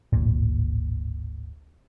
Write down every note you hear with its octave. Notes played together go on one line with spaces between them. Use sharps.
D1 G#1 A#2